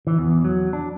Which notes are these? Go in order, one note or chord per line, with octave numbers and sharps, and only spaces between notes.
E3
E2
F#3
D4